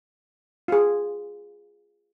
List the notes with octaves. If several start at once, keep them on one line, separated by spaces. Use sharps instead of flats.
F4 G#4